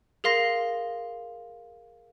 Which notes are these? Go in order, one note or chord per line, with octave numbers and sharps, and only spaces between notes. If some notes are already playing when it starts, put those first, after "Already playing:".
G#4 A#4 F5 C6 A#6